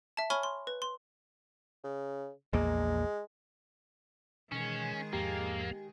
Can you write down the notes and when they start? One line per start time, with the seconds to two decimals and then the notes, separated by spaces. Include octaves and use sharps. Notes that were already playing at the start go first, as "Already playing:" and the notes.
0.17 E5 A5
0.30 C#5 G#5 B5 C#6 F6 G7
0.43 C6
0.67 B4
0.82 C6
1.84 C#3
2.53 A#1 E2 G#3 A#3
4.52 B2 D#3 E3 G#3 C#4 G#4
5.13 E2 G#2 F3 A#3 G4